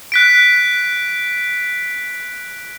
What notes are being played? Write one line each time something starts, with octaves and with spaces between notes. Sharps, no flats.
F#6 B6 D7